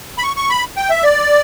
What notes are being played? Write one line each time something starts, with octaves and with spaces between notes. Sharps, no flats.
B5
C#6
C#6
B5
G5
E5
D5